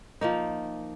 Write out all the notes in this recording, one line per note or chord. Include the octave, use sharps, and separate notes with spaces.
F3 A#3 D#4